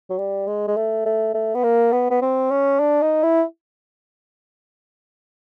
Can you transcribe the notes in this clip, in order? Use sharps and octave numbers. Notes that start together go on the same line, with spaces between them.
F#3
G3
G#3
G#3
A3
A3
A3
B3
A#3
B3
B3
C4
C#4
D4
D#4
E4